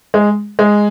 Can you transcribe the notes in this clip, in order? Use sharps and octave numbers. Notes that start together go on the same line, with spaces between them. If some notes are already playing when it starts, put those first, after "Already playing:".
G#3
G#3